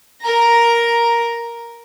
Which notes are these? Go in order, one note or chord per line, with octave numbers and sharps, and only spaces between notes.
A#4 A#5